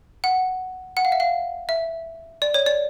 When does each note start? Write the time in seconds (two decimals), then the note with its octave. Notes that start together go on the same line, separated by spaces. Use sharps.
0.24 F#5
0.97 F#5
1.05 F5
1.12 E5
1.20 F5
1.69 E5
2.42 D5
2.54 C#5
2.66 D5